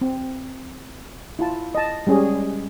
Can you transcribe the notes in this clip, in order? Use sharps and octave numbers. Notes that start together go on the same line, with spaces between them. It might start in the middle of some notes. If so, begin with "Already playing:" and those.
C4
E4 F4 A5
D#5 A5
G3 G#3 C#4 G#4